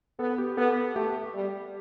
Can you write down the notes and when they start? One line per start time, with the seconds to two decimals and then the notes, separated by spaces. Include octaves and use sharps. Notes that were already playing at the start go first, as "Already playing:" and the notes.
0.19 B3 A4
0.38 G4
0.57 B3 A4
0.95 A3 G4
1.34 G3